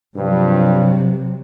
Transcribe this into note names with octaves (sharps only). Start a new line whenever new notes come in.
G2 C3 F3 F#3